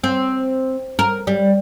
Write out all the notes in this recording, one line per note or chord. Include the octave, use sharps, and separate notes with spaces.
C4
A#4
G3